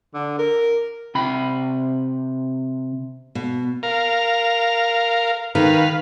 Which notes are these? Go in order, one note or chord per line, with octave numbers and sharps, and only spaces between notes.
D3
A#4
C3 G5 B5
B2
A#4 F5
D#3 B4 F5